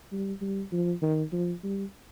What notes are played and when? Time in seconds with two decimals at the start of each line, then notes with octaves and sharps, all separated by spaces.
0.12 G3
0.41 G3
0.72 F3
1.02 D#3
1.32 F3
1.63 G3